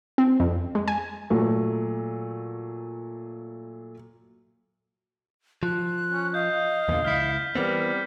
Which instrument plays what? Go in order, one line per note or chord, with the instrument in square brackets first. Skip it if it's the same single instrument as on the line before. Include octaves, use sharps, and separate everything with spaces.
[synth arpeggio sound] C4
F2
G#3
G#5
[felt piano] A#2 F#3 A3
[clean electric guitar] F3 [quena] F#6
[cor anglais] C#4
[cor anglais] D#5 [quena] F5 [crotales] G6
[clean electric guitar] E2 A#2 D3
[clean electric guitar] C#2 E4 [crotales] F6 G6 B6
[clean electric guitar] E3 B3 C4 [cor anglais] G3 [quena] A#4 [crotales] C#7